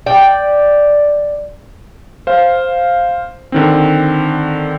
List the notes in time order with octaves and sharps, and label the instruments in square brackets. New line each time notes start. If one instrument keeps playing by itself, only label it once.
[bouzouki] D5 G5
[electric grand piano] C5 F5
D3 D#3 C4